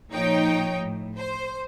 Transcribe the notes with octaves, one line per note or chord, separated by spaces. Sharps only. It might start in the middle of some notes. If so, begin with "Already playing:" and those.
A#2 F3 D#4 C#5 G5
A2
C5